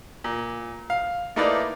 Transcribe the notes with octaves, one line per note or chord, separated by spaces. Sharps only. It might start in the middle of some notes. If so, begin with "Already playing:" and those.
A#2
F5
A3 A#3 D#4 E4 B4 D5